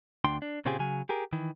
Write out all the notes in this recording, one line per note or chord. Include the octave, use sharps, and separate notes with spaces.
D2 D4 G5 C6
D4
A#2 C#3 C4 F4 G4 G#4
C#3 F#3 G#5
G4 G#4 A#4
D#3 E3